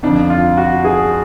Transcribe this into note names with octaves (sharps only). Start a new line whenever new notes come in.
F2 D3 F3 D4
F4
F#4
G#4